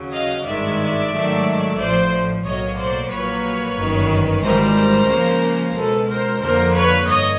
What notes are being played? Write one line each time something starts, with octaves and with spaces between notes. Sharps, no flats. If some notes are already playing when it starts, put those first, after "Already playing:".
Already playing: D#2 C#3 F#3
D#5 F5
G#1 G2 D#3 G#3 D5 E5
G#2 D#3 F#3 A3
A1 A2 F3 C5 D5
B1 A2 F#3 A#3 C#5 D#5
C5 D5
A#1 A#2 F#3 A#3 B4 C#5
G1 F#2 D#3
G#1 G#2 E3 G3 A#4 C5
C#2 C#3 F3 A#3
C#2 B2 G#3 A4 B4
A#4 C5
F2 D3 F3 A#3 A#4 C5
B4 C#5
G2 C#5 D#5